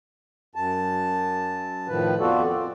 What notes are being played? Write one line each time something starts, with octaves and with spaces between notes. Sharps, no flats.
F#2 A5
A2 D#3 F3 B4
F2 B3 F4 F#4 A4 D5
C4